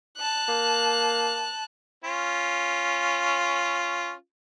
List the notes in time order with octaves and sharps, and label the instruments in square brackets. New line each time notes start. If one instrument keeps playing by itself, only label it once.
[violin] A5 F#6
[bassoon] A#3
[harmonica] C#4 F4